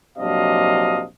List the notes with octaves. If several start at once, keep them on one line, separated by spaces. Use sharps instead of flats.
A#1 C3 F#3 D4 D#5 F5